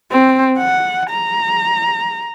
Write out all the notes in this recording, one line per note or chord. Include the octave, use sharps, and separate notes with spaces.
C4
F#5
A#5